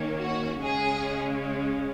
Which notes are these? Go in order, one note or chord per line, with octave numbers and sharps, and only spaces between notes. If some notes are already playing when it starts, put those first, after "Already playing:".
Already playing: D#3 A#3 C#4
F#4
C#3 G#3 C#4 G#4